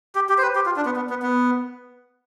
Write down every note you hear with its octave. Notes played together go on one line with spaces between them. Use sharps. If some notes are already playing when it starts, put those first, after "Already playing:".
G4
G4
C5
B4
G4
F4
D4
B3
B3
B3
B3